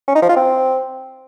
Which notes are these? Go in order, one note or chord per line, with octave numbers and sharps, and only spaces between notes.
C#4
D#4
F3
F4
C4